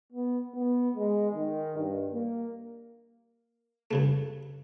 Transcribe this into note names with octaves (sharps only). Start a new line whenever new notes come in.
B3
B3
G#3
D#3
G2
A#3
G2 C#3 A3